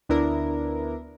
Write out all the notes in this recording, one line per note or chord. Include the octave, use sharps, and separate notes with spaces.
D2 B3 D4 E4 A#4